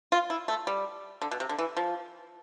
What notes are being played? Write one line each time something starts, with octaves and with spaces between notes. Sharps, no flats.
F4
E4
A3
G3
D3
B2
C3
D3
E3
F3